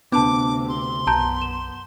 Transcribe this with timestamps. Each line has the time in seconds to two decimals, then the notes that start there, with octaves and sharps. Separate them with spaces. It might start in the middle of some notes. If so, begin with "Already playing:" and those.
0.12 D2 C3 B3 D4 A5 D6
0.68 C6
1.07 B1 F#2 B3 A5 A#5 G6
1.42 E7